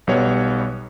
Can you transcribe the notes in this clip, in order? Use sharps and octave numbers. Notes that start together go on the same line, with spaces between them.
B1 G3 B3 C#5